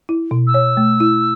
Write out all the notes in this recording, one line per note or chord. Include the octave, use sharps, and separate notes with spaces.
E4
B2
E6
C#5
A3
E4